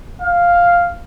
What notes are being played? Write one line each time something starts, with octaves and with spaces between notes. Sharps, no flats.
F5